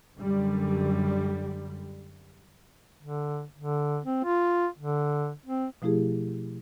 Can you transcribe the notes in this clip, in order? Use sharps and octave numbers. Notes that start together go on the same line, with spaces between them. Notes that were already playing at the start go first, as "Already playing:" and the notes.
F#2 D3 G3
D3
D3
C4
F4
D3
C4
B2 F3 A3 E4 G4 G#4